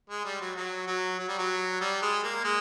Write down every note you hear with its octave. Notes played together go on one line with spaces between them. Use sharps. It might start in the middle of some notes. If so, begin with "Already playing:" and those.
G#3
G3
F#3
F#3
F#3
F#3
G3
F#3
G3
G#3
A#3
G#3